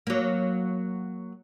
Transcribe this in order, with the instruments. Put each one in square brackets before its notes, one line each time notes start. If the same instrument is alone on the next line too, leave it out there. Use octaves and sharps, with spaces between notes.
[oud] F#3 A#3